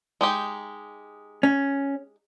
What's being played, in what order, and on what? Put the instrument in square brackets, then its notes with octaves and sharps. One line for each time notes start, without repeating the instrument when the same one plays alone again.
[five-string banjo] G#3 D#4 G4
[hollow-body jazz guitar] C#4